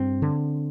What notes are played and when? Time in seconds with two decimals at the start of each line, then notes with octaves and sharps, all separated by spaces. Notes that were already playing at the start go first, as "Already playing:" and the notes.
Already playing: G2 C4
0.22 D3